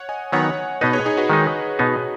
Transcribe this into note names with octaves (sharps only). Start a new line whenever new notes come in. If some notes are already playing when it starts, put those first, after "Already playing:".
Already playing: C#5 F#5
D#5 G#5
D#3 F#3 B3 D#4 C#5 F#5
B2 B3 D#4 B4 D#5
G#4 C#5
D#4 G#4
F#4 B4
D#3 G#3 D#4
B2 B3 D#4